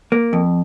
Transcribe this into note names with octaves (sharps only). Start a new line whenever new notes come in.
A#3
F2